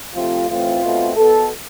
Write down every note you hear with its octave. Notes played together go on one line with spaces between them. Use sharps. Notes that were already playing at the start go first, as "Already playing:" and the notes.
C3 F3 A3 C4 F4
A2 E3 A3 C4 F4
B2 A3 C4
B2 B3 A4